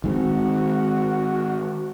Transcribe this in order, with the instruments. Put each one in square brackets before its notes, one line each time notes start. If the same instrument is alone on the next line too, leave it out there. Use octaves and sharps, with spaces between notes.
[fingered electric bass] D#3 G#3 C4 [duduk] F#4